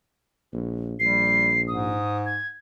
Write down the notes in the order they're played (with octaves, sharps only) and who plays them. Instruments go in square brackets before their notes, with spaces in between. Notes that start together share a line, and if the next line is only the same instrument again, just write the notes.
[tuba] A#1
[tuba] A#1 [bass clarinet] G3 [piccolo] C7
[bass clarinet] G#2 [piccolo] D#6
[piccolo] G#6